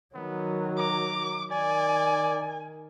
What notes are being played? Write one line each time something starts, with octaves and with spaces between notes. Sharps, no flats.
D#3 F#3 B3
A#5 D6
D#3 D5 G#5